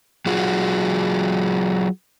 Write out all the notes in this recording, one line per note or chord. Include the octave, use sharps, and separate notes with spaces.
F#3 F4 F#4 G#4